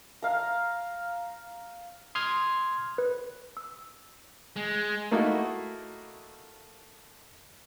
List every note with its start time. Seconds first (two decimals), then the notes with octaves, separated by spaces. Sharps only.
0.22 F5 A#5
2.15 C6 D#6 F6 G#6
2.98 B4
3.57 E6
4.56 G#3
5.11 A3 A#3 D#4 E4 F#4